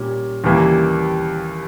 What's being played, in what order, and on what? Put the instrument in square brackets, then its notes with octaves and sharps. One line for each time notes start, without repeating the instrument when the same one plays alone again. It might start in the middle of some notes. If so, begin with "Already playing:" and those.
Already playing: [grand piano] A#2 G3 C#4
D#2 C#3 E3 G3 A#3